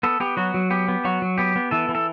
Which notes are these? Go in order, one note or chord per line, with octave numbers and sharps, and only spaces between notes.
B3 A4
B3 G4
F#3 F#4
F#3
B3 G4
B3
F#3 F#4
F#3
B3 G4
B3
E3 A4
E3
A4